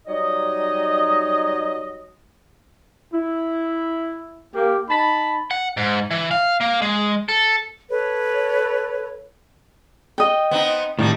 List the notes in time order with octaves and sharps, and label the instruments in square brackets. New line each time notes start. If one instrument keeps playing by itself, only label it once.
[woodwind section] F#3 G3 D#4 C#5 D#5
[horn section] E4
A#3 G4
D#4 A5 B5
[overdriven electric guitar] F#5
G#2
E3
F5
A#3
G#3
A4
[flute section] A4 B4 C#5
[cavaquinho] D#5 G5
[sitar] B3 C4 D#4
[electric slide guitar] A2 D#3 [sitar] G3 D#4